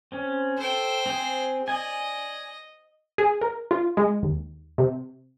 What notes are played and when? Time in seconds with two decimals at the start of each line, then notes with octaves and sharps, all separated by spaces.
0.12 C4 C#4
0.58 A4 C5 G5
1.06 C4 G#4
1.68 D5 D#5 G#5
3.18 G#4
3.41 A#4
3.71 F4
3.97 G#3
4.23 D#2
4.78 C3